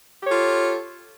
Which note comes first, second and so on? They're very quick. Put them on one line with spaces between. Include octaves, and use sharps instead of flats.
G4 C#5 A4 F4